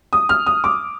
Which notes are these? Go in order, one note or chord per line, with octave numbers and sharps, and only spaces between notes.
D#6
F6
D#6
D6